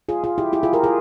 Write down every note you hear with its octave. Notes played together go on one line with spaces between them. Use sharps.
F4 G#4
F4 G#4
E4 G4
E4 G4
F4 G#4
G4 A#4
F4 G#4